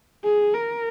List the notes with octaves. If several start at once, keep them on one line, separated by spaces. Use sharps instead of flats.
G#4
A#4